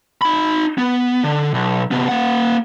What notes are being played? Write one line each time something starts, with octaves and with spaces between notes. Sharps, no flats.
D#4 B5
B3
D3
B1
C3 B3
A#3 F#5